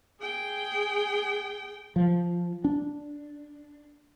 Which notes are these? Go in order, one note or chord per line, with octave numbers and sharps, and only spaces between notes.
G#4 G5
F3
D4